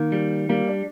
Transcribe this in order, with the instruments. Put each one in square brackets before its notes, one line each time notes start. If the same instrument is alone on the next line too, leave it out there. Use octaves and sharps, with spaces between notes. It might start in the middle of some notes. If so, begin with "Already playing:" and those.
Already playing: [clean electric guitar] D#3 [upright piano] A#3
[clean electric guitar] G3
[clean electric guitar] G3 [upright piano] A#3
[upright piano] D4